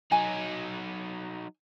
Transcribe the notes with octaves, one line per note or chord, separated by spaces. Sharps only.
F#3 D#4 G#5